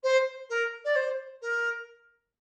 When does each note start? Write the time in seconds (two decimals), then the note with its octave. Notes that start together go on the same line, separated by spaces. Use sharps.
0.03 C5
0.49 A#4
0.84 D5
0.95 C5
1.41 A#4